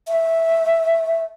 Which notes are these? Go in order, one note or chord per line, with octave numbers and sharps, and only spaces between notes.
E5